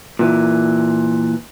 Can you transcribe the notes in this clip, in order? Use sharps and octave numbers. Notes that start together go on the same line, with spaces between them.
A#2 E3